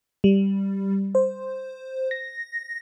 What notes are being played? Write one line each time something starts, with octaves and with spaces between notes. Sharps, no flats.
G3
C5
A#6